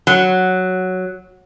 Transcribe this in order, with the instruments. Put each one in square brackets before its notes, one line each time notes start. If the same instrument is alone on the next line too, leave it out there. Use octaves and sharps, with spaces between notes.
[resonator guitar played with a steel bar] F#3